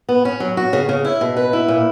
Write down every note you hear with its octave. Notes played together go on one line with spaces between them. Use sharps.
B3
C#4
F#3
F#4
C#3
C#3
E4
B2
B4
E4
A#2